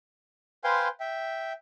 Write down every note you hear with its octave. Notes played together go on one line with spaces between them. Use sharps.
B4 C5 F5 G5 G#5 C6
E5 G5